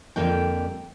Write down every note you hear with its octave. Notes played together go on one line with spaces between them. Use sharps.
F2 D3 G3 A#3 D4 G5